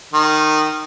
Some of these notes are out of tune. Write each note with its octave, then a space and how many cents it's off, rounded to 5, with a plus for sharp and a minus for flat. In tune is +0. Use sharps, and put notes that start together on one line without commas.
D#3 -15